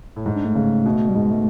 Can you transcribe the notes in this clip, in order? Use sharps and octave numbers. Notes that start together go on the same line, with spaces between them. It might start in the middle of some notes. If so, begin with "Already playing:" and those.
A2
G#2
D4
A3
C#3
B2
G3
G#2 G#3
A3